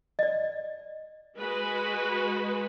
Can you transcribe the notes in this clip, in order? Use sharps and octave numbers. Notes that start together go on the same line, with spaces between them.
D5 D#5
G#3 F#4 B4